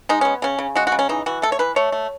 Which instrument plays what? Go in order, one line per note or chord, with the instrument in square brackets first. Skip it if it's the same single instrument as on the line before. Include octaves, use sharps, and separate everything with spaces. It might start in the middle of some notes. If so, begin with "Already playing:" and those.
[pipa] G#3 D#4
B3 C#4
C#3 C#4
C#3
G#3 F#4
F#4
C#3
C#4
E3 D#4
E3 F#4
A3 A4
C#5
E3 B4
A3 C#5
A3